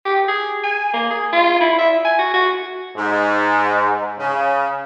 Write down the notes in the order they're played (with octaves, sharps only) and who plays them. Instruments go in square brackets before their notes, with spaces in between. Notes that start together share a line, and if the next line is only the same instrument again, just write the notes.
[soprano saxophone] G4
G#4
G#5
A#3
G#4
F4
E4
E5
G#5
F#4
F#4
[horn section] G#2
C#3